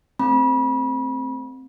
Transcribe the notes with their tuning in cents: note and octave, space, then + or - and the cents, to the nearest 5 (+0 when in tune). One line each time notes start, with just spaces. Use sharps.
A3 +15 C4 +0 B5 -30